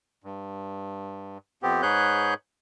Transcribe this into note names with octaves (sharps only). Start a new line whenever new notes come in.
G2
F2 B3 C4 G4
G#2 G#4 B4 C#5 F#6 G6